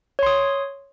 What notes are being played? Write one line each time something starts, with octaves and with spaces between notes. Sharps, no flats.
C#5 C6 D#6